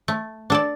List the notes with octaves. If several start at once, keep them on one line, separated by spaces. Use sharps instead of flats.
A3
D4 A4 D5